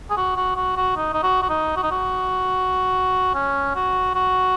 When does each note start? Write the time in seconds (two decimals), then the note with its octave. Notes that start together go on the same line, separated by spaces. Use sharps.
0.10 G#4
0.17 F#4
0.36 F#4
0.56 F#4
0.77 F#4
0.96 D#4
1.13 D#4
1.23 F#4
1.42 F#4
1.49 D#4
1.76 F#4
1.83 D#4
1.91 F#4
3.35 C#4
3.75 F#4
4.15 F#4